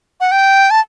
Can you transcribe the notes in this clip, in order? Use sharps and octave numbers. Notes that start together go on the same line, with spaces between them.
F#5
G5
A5